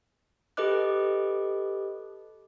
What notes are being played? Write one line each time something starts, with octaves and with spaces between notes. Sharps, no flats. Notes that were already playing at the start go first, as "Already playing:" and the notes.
G4 A4 B4 D#5 D6 F#6